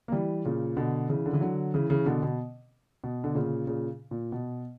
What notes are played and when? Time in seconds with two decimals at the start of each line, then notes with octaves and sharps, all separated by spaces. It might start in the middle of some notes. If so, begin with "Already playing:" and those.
0.08 A#3
0.12 E3 G3
0.45 A#2 C#3
0.77 B2 D3
1.09 C#3 E3
1.26 D3
1.33 E3
1.41 D3 F#3
1.74 C#3 E3
1.90 C#3 E3
2.06 B2 D3
2.23 B2
3.04 B2
3.24 D3
3.35 A#2 C#3
3.67 A#2 C#3
4.11 A#2
4.32 B2